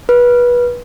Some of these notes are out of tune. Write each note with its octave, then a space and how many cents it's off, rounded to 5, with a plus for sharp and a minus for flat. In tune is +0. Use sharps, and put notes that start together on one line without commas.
B4 -25